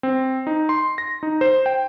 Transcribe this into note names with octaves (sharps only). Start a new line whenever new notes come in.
C4
D#4
C6
A#6
D#4
C5
G5